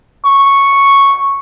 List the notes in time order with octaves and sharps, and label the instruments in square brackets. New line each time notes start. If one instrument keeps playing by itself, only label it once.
[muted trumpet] C#6